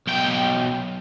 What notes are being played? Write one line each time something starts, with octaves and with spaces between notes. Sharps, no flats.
B1 G5